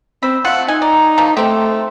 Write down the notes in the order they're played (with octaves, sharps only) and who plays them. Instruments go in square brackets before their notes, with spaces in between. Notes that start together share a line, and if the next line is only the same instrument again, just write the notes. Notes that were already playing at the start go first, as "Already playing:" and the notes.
[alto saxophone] C4 [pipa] B5 [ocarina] E6
[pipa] A3 F4 [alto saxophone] F#5
[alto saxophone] D#4 [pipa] G#5
[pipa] D5 [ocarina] A#5
[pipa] F3 A3 A#3
[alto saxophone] A3 [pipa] C4 G4 [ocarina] C6